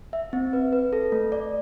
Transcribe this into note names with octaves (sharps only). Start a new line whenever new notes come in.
E5
C4
B4
B4
A4
A3
D5